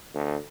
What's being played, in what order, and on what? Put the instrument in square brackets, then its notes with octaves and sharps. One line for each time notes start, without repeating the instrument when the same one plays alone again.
[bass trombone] D2